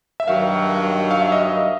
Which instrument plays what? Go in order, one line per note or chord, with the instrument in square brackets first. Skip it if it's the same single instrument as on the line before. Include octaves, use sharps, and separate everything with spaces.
[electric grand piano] E5
[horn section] G2 D#3 F#3 [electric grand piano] F5
[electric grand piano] F5
E5
D#5